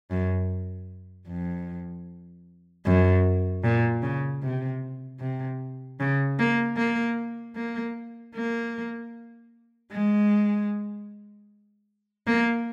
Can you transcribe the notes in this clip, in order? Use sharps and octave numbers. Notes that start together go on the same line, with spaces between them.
F#2
F2
F#2
A#2
C#3
C3
C3
C#3
A#3
A#3
A#3
A#3
G#3
A#3